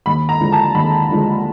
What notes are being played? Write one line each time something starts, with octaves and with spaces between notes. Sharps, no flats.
D#2 B5
A#5
D3 F3 G#3
A5
D#2 B5
D3 F3 G#3